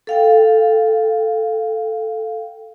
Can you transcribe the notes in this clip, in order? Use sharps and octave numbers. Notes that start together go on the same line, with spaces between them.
A4 F5 G5